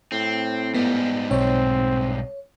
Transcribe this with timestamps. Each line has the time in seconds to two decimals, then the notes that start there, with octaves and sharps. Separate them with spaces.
0.12 A2 C4
0.74 G#2 G3 B3
1.31 B1 C4 C#5